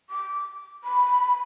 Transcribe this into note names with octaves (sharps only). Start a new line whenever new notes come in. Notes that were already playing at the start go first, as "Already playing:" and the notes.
D6
B5